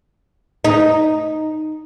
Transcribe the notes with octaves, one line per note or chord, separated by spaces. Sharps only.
D#4